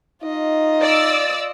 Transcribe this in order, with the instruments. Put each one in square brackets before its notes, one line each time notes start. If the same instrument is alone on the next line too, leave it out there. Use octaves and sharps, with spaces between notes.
[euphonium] D#4 [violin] F4 D#5
[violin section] D5 E6